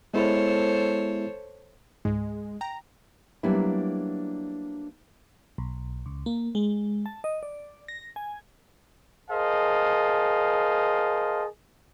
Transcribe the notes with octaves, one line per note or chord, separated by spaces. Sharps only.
G#3 B3 E4 A4 C5 C#5
C#2 G#2 G#3
G5 A#5
F#3 G3 A#3 B3 D4 E4
B1
C#2
A#3
G#3
A5
D#5
D5
A#6
G#5
G#4 A#4 C5 D#5 F5 A5